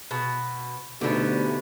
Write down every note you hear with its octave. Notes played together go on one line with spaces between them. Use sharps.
B2
D2 B2 D3 B3 D#4 G4